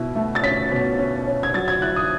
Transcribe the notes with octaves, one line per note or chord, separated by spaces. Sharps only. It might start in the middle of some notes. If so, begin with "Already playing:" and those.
Already playing: B2 E4
A3
A6
C#4 B6
B2
C#4
C#4
G#6
F#3 A6
G#6
E4 F#6
D#6